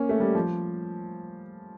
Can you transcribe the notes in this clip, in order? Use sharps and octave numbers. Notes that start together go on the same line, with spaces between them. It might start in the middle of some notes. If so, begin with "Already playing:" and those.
Already playing: A#3 C#4
A3
G3
F3